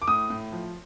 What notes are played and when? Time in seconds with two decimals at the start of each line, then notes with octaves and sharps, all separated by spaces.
0.02 D6
0.07 A2 D#6
0.30 A2
0.52 F3